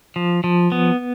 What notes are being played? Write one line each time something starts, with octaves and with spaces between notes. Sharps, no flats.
F3
F3
B3